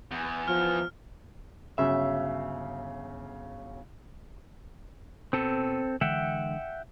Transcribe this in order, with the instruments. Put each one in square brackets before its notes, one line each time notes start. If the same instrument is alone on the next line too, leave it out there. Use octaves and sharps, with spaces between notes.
[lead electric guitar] E2
[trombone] F3 [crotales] F6
[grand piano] G1 C#3 F#3 [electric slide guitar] E5
[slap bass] B2 [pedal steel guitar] C4 A4
[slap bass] D3 E3 G#3 [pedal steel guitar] E5 F#5 G5